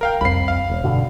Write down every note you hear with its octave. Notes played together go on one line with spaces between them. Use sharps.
A#4 F5 G5
C2 F2 B5 C7
F5
E1
G2 B2 D3